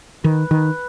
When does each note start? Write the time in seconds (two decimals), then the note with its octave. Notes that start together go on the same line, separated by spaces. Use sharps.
0.24 D#3 B4
0.51 D#3